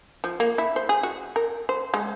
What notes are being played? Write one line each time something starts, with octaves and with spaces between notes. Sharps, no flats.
F3
A#3
E4
C5
G#4
F#4
A#4
C5
G#3